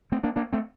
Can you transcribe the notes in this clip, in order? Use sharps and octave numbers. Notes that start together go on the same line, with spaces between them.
A3 C4
A#3 D4
A#3 D4
A3 C4